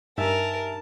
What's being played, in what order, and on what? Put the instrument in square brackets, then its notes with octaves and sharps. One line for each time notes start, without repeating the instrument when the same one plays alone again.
[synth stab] G2 [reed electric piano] D#4 E5 G#5 [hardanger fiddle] A#4 [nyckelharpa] A5